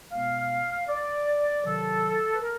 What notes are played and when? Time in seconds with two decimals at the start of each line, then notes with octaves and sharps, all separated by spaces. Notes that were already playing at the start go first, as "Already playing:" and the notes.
0.12 B2 G#3 B3 F5
0.89 D5
1.65 C3 D#3 F#3 A4
2.33 B4
2.42 A#4